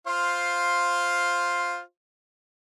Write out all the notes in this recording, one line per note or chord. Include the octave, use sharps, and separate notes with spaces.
F4 C5 F5